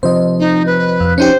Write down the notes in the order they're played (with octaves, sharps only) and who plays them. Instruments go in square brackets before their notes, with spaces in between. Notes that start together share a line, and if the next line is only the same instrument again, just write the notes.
[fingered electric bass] C3 F3 [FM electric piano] C5 D#5
[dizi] D#4
B4
[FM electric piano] F2
[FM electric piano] C#4 D#4 G4 [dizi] C5